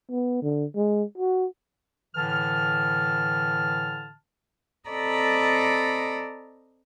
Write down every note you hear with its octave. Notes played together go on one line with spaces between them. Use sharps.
B3
D3
G#3
F#4
A2 D3 E3 A5 F6
C4 A4 D5 D#5 A#5 B5